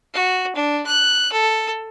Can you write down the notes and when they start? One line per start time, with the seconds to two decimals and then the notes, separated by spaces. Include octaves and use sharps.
0.14 F#4
0.56 D4
0.86 F#6
1.32 A4